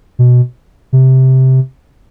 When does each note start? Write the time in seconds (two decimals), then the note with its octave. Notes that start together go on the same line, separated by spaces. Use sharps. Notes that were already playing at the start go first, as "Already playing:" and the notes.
0.19 B2
0.93 C3